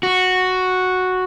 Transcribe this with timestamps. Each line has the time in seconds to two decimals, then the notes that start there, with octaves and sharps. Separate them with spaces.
0.03 F#4